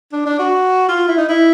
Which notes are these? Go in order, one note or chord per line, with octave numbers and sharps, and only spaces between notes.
D4
D4
F#4
F4
E4
D#4
E4